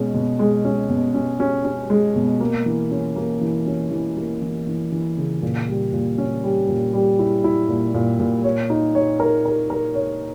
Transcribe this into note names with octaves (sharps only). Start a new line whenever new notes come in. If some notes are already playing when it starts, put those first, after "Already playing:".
Already playing: B2 G#3 C#4
B2
G#3
C#4
B2
C#4
C#4
C#4
G#3
B2
A#3
E3
C#4
A#3
E3
C#4
E3
A#3
E3
E3
E3
C#3
A#2
G3
A#2
C#4
G3
A#2
G3
E4
E4
A#2
A#2
A#2
C#5
D#4
C#5
A#4
A#4
A#4
C#5